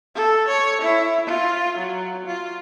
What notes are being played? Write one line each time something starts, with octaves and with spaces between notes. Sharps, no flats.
A4
C#5
E4
F4
F#3
F4